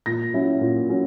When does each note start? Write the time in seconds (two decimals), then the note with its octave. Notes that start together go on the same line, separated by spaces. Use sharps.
0.06 A#2 A#6
0.33 F#3 C#4 E4
0.61 A#2
0.89 F#3 C#4